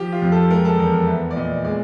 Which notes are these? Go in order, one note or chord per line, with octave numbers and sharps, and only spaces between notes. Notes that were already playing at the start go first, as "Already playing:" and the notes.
Already playing: F3 G4
F4
F2
A4
G#3 A#4
A4
E2 A#4
A#4
B3 E5
D5
A#2 D#5
G#3 D5